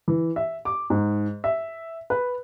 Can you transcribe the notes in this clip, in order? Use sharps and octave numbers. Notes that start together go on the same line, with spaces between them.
E3
E5
D6
G#2
E5
B4